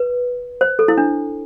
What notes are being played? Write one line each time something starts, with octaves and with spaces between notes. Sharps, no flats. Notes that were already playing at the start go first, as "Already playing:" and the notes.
Already playing: B4
C5
A4
E4
D4